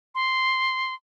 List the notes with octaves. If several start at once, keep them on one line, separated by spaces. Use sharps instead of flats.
C6